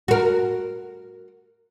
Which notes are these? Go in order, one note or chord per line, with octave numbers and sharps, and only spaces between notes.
F#4 A#4